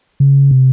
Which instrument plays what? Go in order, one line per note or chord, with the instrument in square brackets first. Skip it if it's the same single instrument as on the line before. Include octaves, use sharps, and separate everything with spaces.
[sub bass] C#3
C3